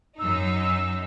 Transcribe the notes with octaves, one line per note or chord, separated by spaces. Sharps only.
F#2 D#4 E6